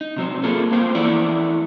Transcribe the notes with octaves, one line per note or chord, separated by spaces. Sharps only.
D#4
C3 F#3 C4
A#3 F4 G#4 A4
A#3 F4 C5 F5 G5
E3 A3 B3 E4 D5